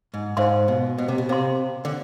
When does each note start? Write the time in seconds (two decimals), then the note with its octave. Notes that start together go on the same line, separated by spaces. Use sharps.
0.14 G#2
0.37 G#2 C5 F5 C6
0.68 B2
0.98 B2
1.08 C3
1.18 B2
1.29 C3 C5 F5 C6
1.85 D3